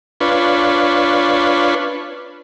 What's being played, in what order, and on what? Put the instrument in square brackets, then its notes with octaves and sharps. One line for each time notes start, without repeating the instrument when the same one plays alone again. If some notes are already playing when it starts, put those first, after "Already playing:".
[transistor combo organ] D4 F4 B4 C#5